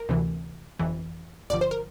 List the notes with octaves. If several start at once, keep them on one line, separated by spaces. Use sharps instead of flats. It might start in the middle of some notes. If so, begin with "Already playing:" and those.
Already playing: A#4
D2 C3 E3
G1 F2 E3
G1 G2 D3 F3 D5
C5
A#4